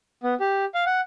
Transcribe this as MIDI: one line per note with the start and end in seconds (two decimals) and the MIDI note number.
0.23 0.34 59
0.40 0.65 67
0.74 0.84 77
0.86 1.01 78